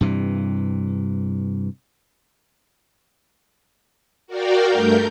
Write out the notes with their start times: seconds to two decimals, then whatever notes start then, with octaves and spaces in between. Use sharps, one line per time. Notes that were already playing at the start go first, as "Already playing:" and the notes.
0.01 G2 C3 E3
4.27 F#4 A#4 D5 F5 G5
4.68 G2 A3 A#4 G6